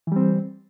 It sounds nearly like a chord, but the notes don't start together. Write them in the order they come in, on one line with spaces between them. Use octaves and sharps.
E3 G3 C4